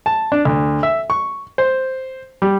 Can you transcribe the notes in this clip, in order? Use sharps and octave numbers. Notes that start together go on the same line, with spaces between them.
A5
D4
D2
E5
C#6
C5
G3